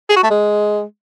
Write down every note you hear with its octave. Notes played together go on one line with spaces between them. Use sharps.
G#4
F#4
A3
G#3